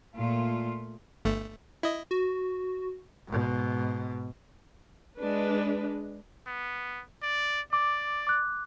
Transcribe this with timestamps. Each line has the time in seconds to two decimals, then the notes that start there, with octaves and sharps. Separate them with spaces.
0.15 A#2 A3 F4
1.25 G1 A3
1.83 E4 D#5
2.11 F#4
3.27 G#2 B2
5.18 G#3 D4 B4
6.47 B3
7.23 D5
7.73 D5 D6
8.27 D6 F#6